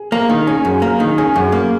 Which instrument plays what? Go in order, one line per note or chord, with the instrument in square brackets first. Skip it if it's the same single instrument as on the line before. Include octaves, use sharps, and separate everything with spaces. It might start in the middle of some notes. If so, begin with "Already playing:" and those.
Already playing: [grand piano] G#4
[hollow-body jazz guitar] A#3
D#3
[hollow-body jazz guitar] C#4 [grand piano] G#4
[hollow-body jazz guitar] F#2
[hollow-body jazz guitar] A#3 [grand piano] A#4
[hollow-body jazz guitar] D#3
[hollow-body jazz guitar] C#4 [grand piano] G#4
[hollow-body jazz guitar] F#2
A#3